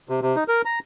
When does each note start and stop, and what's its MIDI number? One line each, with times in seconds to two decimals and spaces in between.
0.09 0.20 48
0.22 0.36 48
0.36 0.44 63
0.48 0.62 70
0.65 0.79 82